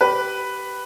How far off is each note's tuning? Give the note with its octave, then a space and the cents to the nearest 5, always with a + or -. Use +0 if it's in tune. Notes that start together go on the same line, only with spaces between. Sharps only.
G4 -20 B4 +0